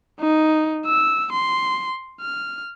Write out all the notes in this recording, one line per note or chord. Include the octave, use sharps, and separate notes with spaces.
D#4
E6
C6
F6